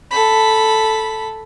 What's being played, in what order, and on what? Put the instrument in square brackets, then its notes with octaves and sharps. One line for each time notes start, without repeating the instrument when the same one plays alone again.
[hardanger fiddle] A4 B5